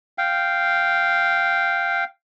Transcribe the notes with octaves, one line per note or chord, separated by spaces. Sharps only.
F5 G5